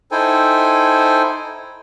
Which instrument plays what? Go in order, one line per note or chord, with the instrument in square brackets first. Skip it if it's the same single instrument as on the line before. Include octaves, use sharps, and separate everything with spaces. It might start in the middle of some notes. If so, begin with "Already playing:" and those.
[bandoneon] D#4 E4 A4 C5 G5 G#5